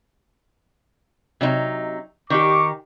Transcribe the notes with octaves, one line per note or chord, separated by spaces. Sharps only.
C3 F#3 D#4
D#3 D#4 G4 C#6 D6